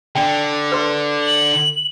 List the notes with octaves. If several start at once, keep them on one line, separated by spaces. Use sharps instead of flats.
D3 G5
B4 C6
F#7